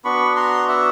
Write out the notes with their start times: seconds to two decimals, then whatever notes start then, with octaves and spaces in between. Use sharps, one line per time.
0.05 B3 D4 F#4 B5 C#6
0.36 A#5 C6
0.68 E5 F#5